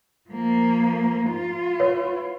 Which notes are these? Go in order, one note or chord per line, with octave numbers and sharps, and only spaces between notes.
F3 A#3
F4
B4 C#5